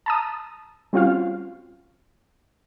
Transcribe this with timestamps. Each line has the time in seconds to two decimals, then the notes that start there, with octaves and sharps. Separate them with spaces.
0.06 A5 A#5 D#6
0.93 G3 C4 C#4 F4 F#4 F5